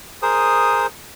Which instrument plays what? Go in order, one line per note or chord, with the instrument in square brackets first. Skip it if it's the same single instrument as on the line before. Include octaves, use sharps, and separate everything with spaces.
[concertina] G#4 A#4 C5 D#6